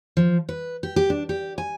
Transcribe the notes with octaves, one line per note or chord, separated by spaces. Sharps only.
F3
B4
G4
G4
D4
G4
G#5